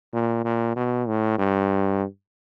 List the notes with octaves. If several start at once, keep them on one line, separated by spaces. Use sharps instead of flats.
A#2
A#2
B2
A2
G2